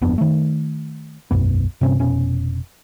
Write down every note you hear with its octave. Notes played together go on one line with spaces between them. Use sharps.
G1 F2 B3 D4
D#3 A3
E1 B1 F#2 B3
G2 C3 C4 C#4
F1 B2 C#4